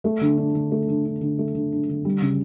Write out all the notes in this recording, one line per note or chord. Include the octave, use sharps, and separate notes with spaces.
A3
D3
D4
D3
A3
D3
D4
D3
A3
D3
D4
D3
G3
C#3